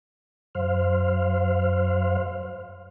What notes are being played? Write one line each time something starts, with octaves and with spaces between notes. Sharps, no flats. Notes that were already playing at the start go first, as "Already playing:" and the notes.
F#2 C5 F5